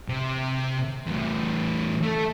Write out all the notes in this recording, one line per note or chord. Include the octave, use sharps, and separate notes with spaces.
C3
E2 A2
A3 A4